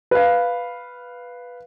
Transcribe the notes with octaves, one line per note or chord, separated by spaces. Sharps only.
B4 F5